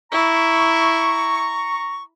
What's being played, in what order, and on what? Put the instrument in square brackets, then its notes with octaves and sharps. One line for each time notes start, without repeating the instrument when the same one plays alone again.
[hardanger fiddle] E4 [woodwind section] A#5 C#6